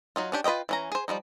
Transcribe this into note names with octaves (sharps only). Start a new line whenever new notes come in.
F#3 D#4 F4
C#4 D4 G4
F4 B4 C#5 D#5 G5
E3 C#4 A#5
G#4 C5
F3 G3 G#3 D#4